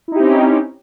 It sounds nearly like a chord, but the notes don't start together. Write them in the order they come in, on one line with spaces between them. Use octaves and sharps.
E4 D#4 G4 C4 C#4